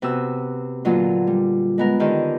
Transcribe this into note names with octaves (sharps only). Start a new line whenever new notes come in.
C3 B3 F#4 E6
A#2 D3 F#3 A#3 B3 F4
G3
G#3 B3 A#4
D3 D#3 G4